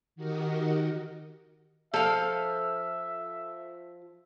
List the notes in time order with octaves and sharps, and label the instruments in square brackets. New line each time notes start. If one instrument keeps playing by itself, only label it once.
[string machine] D#3 F#4 G4 A#4 D#5 F#5
[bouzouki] F3 F5 [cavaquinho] A4 [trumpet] E5